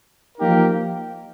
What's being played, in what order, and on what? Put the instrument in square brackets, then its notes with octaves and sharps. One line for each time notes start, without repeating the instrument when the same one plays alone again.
[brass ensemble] F3 A#3 D#4 G4 A#4